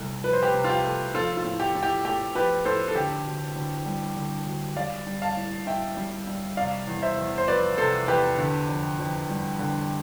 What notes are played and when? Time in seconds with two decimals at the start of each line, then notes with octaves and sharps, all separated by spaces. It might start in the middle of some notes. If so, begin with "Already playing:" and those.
Already playing: C2 C3 A3
0.24 F3 B4
0.33 C5
0.43 G4 B4
0.54 C3
0.64 F4
0.69 G4
0.84 A3
1.15 F3 F4 A4
1.37 F4
1.45 A2
1.60 G4
1.75 A2
1.83 G4
2.05 A3 G4
2.35 F3 G4 B4
2.65 A2 A4 C5
2.88 A4
2.95 D3 G4
3.25 D2
3.56 D2
3.86 G3
4.16 D3
4.46 D2
4.76 G3 D5 F5
5.07 G3
5.22 F5 A5
5.37 A2
5.67 A2 E5 G5
5.97 G3
6.27 G3
6.57 C3 D5 F5
6.87 E2
7.03 C5 E5
7.18 E2
7.38 C5
7.48 F3 B4 D5
7.78 C3 A4 C5
8.08 E2 G4 B4
8.38 D3
8.68 F2
8.99 F2
9.29 G3
9.59 D3